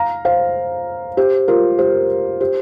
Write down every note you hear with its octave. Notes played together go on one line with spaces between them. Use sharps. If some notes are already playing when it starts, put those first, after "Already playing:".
Already playing: F5 A#5
C5 F5
G4 C5
F4 A#4
G4 C5
G4 C5